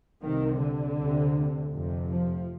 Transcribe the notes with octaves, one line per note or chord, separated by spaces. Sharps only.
C2 C3 D#3
D3
D2 C3
F1 F2 C3
F3